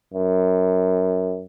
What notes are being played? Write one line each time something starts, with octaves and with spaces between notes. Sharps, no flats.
F#2